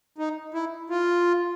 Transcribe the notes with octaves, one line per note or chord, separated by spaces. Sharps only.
D#4
E4
F4